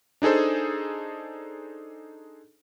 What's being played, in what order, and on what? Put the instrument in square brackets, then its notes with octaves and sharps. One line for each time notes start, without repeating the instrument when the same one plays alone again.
[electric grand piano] D4 D#4 G#4 A4 C5